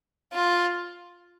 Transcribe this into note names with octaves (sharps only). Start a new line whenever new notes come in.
F4